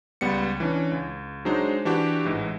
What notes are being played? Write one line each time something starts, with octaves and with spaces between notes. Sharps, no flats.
C#2 G3 B3 C#7
E3 C#4 D4
C#2
F#3 G#3 D4 D#4 C5
E3 D4 F#4 G4
A1 G#2 E3